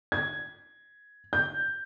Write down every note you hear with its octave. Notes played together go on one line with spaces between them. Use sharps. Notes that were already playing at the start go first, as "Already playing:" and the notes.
G#6
G6